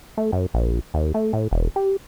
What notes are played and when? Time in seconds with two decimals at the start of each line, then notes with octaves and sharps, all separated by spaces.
0.17 A3
0.33 F#2
0.54 A#1
0.94 D#2
1.14 A3
1.33 A2
1.51 E1
1.76 G4